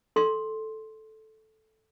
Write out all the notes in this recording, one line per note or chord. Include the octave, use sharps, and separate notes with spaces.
A4 C6